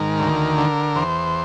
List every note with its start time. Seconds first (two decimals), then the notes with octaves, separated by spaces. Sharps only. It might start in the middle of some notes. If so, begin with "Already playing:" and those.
Already playing: G#2 D#3 A#4
0.20 D2
0.58 D3
0.96 E2 C5